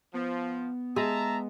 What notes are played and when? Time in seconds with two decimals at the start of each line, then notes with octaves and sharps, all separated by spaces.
0.14 F3 B3
0.96 G#3 G#4 E5 A5 A#5